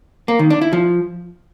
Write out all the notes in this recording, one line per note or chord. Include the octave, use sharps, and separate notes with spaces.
A#3
D#3
D4
E4
F3